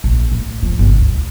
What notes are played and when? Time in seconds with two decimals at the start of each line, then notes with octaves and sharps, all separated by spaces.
0.04 A#1
0.32 A2
0.63 F3
0.79 G1 C2
0.96 D2